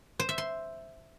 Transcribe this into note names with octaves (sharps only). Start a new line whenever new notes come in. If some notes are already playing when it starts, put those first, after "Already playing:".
C5
E5
C6